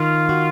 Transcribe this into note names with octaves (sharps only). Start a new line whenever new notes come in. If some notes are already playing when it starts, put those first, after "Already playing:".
Already playing: D#3 F4
F#4